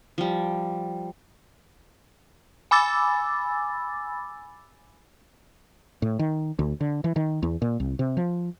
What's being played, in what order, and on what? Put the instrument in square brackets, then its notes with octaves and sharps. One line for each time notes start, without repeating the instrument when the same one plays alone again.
[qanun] F3 G3
[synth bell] G#5 B5 D6 E6 A6
[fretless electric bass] A2
D#3
D2
D3
E3
D#3
E2
A#2
C2
C3
F3